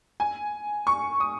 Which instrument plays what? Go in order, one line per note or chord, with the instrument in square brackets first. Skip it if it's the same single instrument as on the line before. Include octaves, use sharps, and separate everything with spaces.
[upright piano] G#5
C#6
D#6